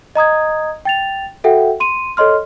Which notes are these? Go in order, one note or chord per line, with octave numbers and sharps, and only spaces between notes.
D#5 A#5 D#6 G#6
G5 A6 F7
F#4 A4 E5 F#5 G5
C6 D#7
A4 C#5 D#5 C6 F6